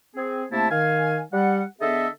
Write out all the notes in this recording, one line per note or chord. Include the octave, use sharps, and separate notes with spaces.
C4 G#4
C3 A3 A#3 E4 A5
D#3 F5 G#5
G3 F#5
D3 B3 G#4 A4 D#5 E5